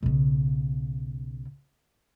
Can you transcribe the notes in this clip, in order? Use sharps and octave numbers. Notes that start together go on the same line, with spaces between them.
B1 C#3